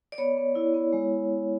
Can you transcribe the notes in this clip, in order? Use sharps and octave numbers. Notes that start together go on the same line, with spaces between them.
D5
B3 C#5
B3
E4
B3
G#3